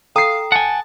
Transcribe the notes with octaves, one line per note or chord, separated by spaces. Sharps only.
A4 F5 G5 A#5 D#6 C7
F#5 G#5 A5